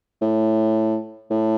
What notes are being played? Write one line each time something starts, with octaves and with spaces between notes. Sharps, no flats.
A2
A2